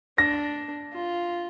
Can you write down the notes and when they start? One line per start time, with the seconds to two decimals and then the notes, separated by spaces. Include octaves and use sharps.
0.18 D4 A#6
0.93 F4